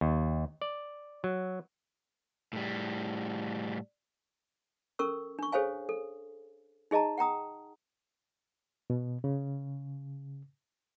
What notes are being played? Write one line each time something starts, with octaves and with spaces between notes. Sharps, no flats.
D#2
D5
F#3
A2 G3
C#4 A4 A#4 C#6 E6
D4 C#6
G#4 A4 C5 C#5 F5 G#5
A4
D#4 G#4 D#5 A5 A#5
F#5 G5 A#5 D#6
B2
C#3